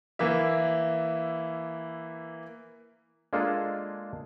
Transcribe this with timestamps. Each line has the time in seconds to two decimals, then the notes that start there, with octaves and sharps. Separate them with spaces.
0.19 E3 A#3 E4 E5
3.33 G#3 A#3 D4 F4 G#4 A4